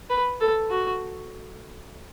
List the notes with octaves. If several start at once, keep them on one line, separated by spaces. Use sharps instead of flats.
B4
A4
F#4